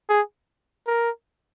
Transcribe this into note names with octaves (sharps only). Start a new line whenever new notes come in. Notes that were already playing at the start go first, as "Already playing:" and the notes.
G#4
A#4